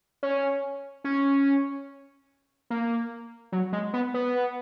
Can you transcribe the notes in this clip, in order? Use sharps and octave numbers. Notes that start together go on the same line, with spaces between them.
C#4
C#4
A#3
F#3
G#3
B3
B3